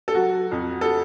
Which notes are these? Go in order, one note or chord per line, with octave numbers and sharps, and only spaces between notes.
A4
F#3 F#4
F2
A4